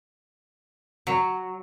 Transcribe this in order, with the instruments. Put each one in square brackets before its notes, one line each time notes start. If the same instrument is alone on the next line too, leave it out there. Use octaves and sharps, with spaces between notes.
[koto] F#3